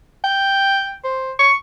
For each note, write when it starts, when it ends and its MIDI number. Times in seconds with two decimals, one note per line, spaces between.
0.24 0.95 79
1.04 1.32 72
1.39 1.54 85